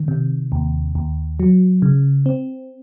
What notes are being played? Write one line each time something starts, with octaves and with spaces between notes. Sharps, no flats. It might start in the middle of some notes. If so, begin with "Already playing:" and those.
Already playing: D#3
C3
D#2
D#2
F#3
C#3
C4